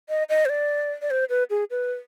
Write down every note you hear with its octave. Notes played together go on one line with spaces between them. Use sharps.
D#5
D#5
C5
D5
D5
C5
B4
G#4
B4